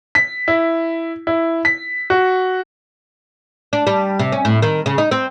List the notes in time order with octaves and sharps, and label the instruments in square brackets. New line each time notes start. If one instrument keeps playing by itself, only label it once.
[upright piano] B6
E4
E4
B6
F#4
[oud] D4
G3
C3
C#4
A2
D#3
C#3
D#4
C4